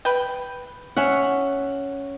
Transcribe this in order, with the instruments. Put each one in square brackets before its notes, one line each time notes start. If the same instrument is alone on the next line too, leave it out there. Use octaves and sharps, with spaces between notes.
[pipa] B4 G5
[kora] C#4 E5 F#5